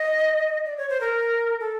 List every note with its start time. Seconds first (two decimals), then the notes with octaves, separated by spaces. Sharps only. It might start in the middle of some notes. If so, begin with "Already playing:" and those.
Already playing: D#5
0.66 D5
0.78 C#5
0.89 C5
1.01 A#4
1.60 A4